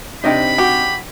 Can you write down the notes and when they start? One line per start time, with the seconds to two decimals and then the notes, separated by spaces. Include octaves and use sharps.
0.24 C3 D4 D#4 C5 D#5 G5 B5
0.58 F#4 G4